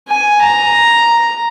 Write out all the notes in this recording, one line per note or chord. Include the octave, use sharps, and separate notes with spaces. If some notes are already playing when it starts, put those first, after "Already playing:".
G#5
A#5